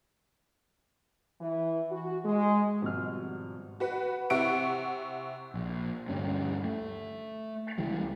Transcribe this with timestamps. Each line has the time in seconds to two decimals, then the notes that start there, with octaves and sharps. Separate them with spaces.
1.41 E3
1.91 F#4
2.25 G#3
2.82 G#1 B2 F3 G3 F#4 F6
3.80 F#4 B4 F#5
4.30 C3 E4 F#5 C#6 D7
5.54 A#1
6.09 D2 G2 G3 C#4
6.64 A3
7.78 C#2 E3 G3